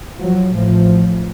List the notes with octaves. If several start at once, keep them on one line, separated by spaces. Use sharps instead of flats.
F3 F#3
A1 A2 F3